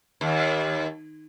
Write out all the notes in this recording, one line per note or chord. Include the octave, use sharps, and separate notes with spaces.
D#2